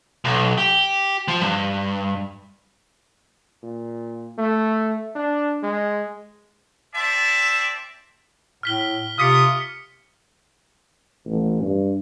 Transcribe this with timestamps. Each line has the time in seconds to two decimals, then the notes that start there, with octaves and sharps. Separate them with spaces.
0.25 B1
0.58 G4
1.28 F3
1.41 G2
3.63 A#2
4.38 A3
5.15 D4
5.63 G#3
6.94 C4 D5 E5 A5
8.63 A2 F6 B6 G7
9.18 C3 F4 D6 D#6 F6 B6 C#7
11.27 A1
11.62 G2